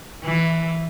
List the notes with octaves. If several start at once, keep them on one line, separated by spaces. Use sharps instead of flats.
E3